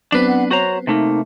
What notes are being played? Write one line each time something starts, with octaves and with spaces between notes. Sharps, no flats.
F#3 B3 C4 D4 B4
F#5
F#4 C5 C#5 A#5
C3 A3 A#3 D#4